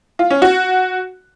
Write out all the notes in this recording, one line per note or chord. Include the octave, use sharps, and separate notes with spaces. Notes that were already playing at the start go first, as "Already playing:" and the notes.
F4
C#4
F#4